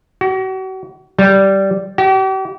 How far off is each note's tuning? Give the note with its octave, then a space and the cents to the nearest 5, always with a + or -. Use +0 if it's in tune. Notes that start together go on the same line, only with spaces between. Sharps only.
F#4 +40
G3 -10
G4 -40